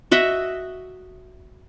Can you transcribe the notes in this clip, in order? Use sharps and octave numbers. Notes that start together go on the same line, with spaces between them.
F#4 D#5 E5